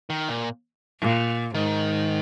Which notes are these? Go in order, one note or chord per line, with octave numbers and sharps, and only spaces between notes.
D#3
A#2
A#2
G#2 D#3